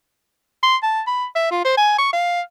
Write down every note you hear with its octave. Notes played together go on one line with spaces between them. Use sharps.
C6
A5
B5
E5
F4
C5
G#5
C#6
F5